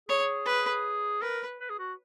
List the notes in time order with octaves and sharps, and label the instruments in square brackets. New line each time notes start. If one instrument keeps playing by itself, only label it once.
[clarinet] G#4 [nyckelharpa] C#5
[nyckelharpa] B4
[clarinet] A#4 [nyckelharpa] B4
[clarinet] B4
G#4
F#4